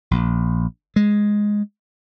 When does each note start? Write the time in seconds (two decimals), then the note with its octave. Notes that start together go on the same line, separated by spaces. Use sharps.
0.11 A#1
0.96 G#3